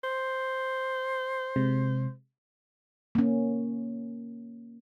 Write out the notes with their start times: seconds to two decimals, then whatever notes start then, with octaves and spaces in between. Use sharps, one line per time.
0.04 C5
1.56 C3 G#3
3.15 A#3 C#4